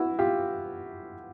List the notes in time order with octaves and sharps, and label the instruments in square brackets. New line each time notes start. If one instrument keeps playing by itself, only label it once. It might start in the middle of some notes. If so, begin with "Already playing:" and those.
Already playing: [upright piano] E4 F#4
F4 G4